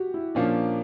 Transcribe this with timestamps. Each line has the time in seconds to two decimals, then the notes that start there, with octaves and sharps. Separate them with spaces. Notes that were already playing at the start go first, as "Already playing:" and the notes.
Already playing: F#4 G4
0.14 E4
0.35 A#2 F3 A#3 C#4 D4 F4